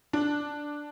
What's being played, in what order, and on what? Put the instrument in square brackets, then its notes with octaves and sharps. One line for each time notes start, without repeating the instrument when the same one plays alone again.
[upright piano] D4